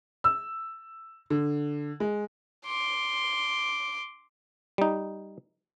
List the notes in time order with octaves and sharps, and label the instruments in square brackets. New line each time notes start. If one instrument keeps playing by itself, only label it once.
[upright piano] E6
D3
G#3
[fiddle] C6 D6
[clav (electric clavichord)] G3 D#4